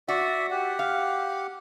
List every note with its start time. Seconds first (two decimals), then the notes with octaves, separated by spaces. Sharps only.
0.08 F#4 D5 E5
0.51 G4 F#5
0.79 F5